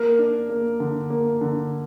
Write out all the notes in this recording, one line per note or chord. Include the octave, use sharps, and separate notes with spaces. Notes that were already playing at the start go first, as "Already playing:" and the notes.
Already playing: A#3 A#4
D4
A#3
D3
A#3
D3